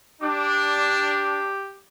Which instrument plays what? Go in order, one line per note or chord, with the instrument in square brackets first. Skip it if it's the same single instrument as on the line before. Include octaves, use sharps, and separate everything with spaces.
[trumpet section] D4 [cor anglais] G4